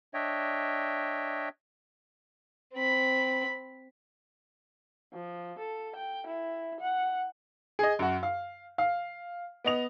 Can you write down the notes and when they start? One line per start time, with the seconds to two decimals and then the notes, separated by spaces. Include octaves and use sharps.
0.14 D4 C#5 D#5 E5 G5
2.74 C4 B5
5.13 F3
5.59 A4
5.96 G5
6.27 E4
6.80 F#5
7.79 G#4 D#5
7.99 F#2 F#4
8.23 F5
8.78 F5
9.64 B3 D#5 F7